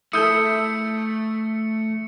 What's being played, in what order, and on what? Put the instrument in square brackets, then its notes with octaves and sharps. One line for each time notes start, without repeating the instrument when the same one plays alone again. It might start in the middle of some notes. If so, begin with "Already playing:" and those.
[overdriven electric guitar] A3 [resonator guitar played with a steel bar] E4 A4 [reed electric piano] D#6 E6 G6 [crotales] C#7